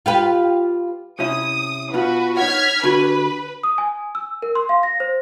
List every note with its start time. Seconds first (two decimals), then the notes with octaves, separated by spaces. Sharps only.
0.06 F4 G4 B4
1.20 C3 C#4 E4 D#6
1.94 B2 F4 F#4 B4
2.37 D#4 C#5 F#5 F6 G#6 B6
2.84 D3 F#4 G4 B4
3.63 D#6
3.78 G#5
4.15 E6
4.42 A#4
4.55 C6
4.69 F5
4.83 A#6
5.00 C5